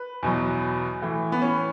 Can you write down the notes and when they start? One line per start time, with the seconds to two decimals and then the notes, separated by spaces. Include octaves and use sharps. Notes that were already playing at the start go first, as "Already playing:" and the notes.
Already playing: B4
0.23 E2 B2 F#3
1.02 A2 E3
1.32 B3
1.42 C#4